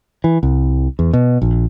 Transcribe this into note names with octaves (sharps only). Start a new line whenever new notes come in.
E3
C2
E2
B2
A#1